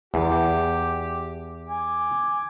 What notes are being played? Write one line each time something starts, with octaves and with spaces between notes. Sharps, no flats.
E2 G4
G#5 D6